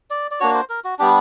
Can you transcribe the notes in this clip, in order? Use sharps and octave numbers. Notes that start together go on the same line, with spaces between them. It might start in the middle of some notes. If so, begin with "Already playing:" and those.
D5
D5
A#3 D4 F#4 C#5
C5
A#4
F#4
G3 B3 D4 G4